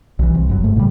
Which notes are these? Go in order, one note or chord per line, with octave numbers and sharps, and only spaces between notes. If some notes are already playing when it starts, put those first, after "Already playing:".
B1 E3
C2
G1 F#2 F#3
G1 G#2 A3
A#2 C#3 F#3 G3